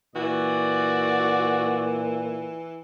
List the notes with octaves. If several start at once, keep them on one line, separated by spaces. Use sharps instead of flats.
A#2 E3 F#4 D5